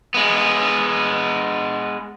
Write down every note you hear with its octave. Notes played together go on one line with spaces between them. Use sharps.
G#3 B3